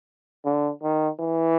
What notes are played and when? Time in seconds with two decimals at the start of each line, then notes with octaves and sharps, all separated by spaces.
0.45 D3
0.83 D#3
1.20 E3